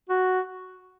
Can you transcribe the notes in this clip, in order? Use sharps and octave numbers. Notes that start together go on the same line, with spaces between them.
F#4